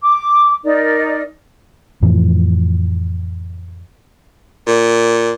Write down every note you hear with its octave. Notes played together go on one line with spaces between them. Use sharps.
D6
D#4 A#4 D5
F2 A2 E3 F3
A#2